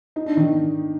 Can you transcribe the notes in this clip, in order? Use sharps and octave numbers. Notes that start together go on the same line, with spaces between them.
D#4
D4
D#3 D#4